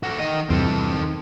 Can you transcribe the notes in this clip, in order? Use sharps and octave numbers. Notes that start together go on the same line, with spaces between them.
F#4 A4
D#3 D#5
E2 G2 C3 C4 A4
D#3